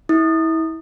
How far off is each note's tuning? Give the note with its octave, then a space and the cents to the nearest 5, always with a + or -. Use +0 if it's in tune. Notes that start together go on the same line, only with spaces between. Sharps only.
E4 -30 D#6 -20